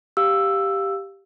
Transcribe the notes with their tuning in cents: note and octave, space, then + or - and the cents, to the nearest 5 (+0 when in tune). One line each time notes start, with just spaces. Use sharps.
G4 +0 F5 +0 E6 +5